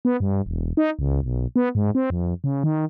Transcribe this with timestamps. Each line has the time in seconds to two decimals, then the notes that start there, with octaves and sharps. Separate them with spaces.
0.05 B3
0.20 G2
0.46 E1
0.77 D#4
0.99 C#2
1.23 B1
1.56 B3
1.75 G#2
1.95 C4
2.10 F2
2.44 C#3
2.64 D#3